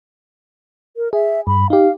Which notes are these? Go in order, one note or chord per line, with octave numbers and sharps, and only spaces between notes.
A#4
G#4 E5
G2 B5
D#4 G4 F5